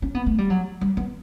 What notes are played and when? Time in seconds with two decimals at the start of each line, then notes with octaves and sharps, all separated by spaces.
0.02 C#4
0.15 B3
0.26 A3
0.38 G3
0.50 F#3
0.81 G3
0.97 B3